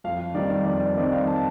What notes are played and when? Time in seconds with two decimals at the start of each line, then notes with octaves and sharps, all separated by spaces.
0.04 F2 F5
0.35 D#3 G3 C4 D#4 D5
0.65 F2 D5
0.97 D#3 G3 C4 D#4 D5
1.13 F5
1.27 A5